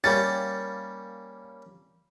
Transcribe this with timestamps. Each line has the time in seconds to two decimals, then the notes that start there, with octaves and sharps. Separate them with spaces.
0.04 G3 A#3 C#4 A6